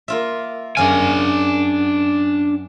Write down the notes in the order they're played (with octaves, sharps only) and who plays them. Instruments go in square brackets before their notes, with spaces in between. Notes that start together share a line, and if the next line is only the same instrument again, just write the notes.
[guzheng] A#3 F4 E5
[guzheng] F#2 G#4 F5 [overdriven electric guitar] D4 G#5